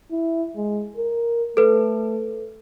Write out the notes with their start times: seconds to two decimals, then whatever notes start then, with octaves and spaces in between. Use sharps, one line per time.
0.12 E4
0.57 G#3
0.97 A#4
1.57 A3 A4 B4